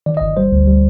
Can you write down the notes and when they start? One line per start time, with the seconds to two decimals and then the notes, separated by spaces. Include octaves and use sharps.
0.06 D#3 D5
0.17 D#5
0.21 G1
0.37 G3 C5
0.52 D2
0.67 G3